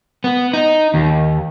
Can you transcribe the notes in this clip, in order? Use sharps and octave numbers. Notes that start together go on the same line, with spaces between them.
B3
D#4
D#2